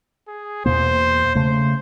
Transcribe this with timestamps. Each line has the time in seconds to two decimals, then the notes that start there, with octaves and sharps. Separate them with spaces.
0.28 G#4
0.66 E2 B2 A#3 C5
1.35 C#3 A3 C5